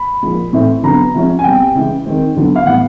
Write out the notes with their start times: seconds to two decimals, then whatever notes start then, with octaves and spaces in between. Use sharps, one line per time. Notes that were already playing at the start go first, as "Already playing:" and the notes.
Already playing: B5
0.23 A#2 F3 G#3
0.53 A2 E3 A3 C4
0.83 D3 F#3 B3 A#5
1.14 C3 F3 G#3 C#4
1.39 G#5
1.44 B2 G3 C4 G5
1.75 C#3 E3 G#3
2.06 D#3 G#3 C4
2.36 D3 F#3 B3
2.56 F5
2.66 A2 E3 G3 B3 F#5